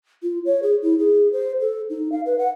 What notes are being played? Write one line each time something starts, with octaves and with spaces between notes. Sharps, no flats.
F4
C#5
G#4
E4
G#4
C5
A4
D#4
F5
B4
F#5